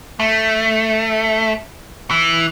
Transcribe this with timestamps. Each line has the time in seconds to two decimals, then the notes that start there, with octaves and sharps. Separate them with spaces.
0.20 A3
2.11 E3